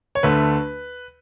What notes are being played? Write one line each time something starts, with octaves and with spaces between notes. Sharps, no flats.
C#5
D2 D3 A3 B4